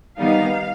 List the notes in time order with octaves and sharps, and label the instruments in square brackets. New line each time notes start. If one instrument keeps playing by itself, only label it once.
[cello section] D#3 G3 B3 D#4 F5